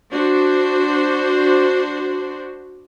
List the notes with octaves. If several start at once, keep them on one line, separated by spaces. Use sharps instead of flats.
D4 F#4 C5